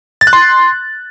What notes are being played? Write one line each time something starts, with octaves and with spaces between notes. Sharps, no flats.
A6
F#6
C6